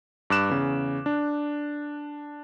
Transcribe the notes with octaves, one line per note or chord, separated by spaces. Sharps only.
G2 D6 F#6 E7
E2 C#3
D4